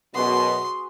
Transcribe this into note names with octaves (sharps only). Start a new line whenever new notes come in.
F#2 B2 B3 F#4 G#4 C6